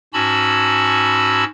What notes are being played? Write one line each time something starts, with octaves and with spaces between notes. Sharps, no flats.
G#2 C#4 F#4 A5 B5 E6